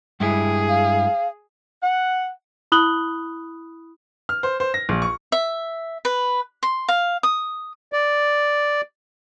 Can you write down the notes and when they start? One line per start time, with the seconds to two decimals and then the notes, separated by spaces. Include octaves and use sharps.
0.20 G2 G#3 E4 G#4
0.69 F5
1.82 F#5
2.72 E4 B5 D#6 F#6 F#7 G7
4.29 F6
4.43 C5
4.60 C5
4.74 A#6
4.89 A#1
5.02 C#6
5.32 E5
6.05 B4
6.63 C6
6.88 F5
7.23 D#6
7.93 D5